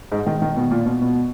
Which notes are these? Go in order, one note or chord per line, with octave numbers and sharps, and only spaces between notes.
G#2
D#3
D#3
B2
A#2
B2
B2